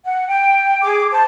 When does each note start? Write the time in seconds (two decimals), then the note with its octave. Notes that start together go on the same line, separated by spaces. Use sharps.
0.05 F#5
0.28 G5
0.82 G#4 D6
1.11 C5 A5